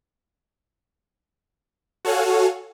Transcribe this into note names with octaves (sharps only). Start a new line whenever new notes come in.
F#4 A4 C#5 F5 F#5 G#5